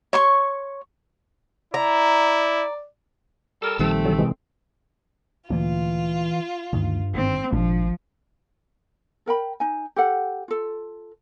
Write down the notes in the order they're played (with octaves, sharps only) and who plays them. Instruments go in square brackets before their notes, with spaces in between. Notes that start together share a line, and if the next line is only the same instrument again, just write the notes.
[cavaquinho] C#5 C6 C#6
[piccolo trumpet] E4 [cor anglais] D5 [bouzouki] A#5
[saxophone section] G3 A4 A#4 [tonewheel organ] A5 E6
[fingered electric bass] A#1 D#3 G3 [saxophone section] A3 C4
[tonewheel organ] D3 F#3 A4
C3 E3 G#3
[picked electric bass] D2 A#2 [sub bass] E3 [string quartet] F4
[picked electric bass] D2 D#3 [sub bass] G2
[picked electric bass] G1 G#2 D#3 [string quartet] C4
[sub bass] G#1 [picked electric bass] A#2 G#3 D4 [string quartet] F3
[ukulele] A4 A#4 G5 B5
D#4 G#5
G4 A4 F#5
F4 A4